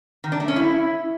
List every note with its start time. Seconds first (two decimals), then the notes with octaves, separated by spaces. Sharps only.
0.24 D#3
0.32 D4
0.40 A3
0.48 C#4
0.56 E4